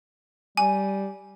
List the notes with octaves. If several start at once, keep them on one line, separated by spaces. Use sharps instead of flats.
G3 G#5